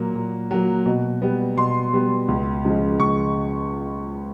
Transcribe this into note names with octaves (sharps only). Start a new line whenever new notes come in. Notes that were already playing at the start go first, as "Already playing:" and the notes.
Already playing: A#2 F#3 A#3
A#2
F#3 A#3
B2
G3 B3
B2 C6
G3 B3
C#2
C#3 F3 G#3
C#2 C#6